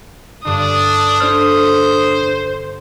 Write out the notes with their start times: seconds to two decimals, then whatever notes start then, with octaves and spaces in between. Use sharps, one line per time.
0.45 G2 D3 D4 D#6
1.20 D4 A4 C5 F6